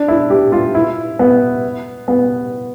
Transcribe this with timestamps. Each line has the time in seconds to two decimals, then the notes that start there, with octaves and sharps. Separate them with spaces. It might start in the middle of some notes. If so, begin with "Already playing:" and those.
Already playing: D4
0.08 E4
0.30 G4
0.52 F4
0.75 E4
1.19 B3
2.08 B3